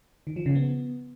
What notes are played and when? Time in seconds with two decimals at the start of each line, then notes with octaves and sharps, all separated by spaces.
0.27 D#3
0.36 F3
0.46 C#3
0.55 B3